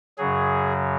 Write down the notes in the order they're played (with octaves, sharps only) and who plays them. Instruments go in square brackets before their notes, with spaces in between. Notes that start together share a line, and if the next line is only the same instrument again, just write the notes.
[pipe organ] F#2 C#3 F#3 G#4